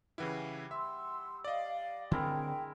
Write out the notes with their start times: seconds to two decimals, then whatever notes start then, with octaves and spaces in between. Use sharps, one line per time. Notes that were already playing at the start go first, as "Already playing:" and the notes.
0.18 C#3 E3 G3 E4 F#5
0.71 E5 C6 E6
1.44 D5 D#5 F5
2.11 D3 G#3 C4 E4 A#4 G5